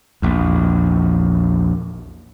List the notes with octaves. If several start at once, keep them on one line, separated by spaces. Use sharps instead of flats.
A#1 E2